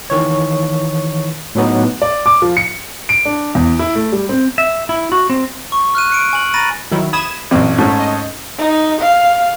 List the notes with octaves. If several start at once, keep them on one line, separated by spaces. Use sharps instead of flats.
D#3 E3 C#5
A2 F#3 B3 D#4
D5
D6
F3
C#7
D7
D4
E2
E4
A3
G3
C4
E5
E4
F#4
C4
C#6
F6 F#6 D#7
F#6 C#7 D7
G#5 F#7
A#5 B5 A6 A#6 D#7
D#3 F#3 E4
B5 D#6 G#6 E7
A1 F#2 A#2 C4
G#2 A3 C#4
D#5
D#4
F5